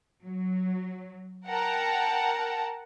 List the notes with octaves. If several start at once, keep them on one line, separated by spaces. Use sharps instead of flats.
F#3
A#4 F#5 G5 A5 A#5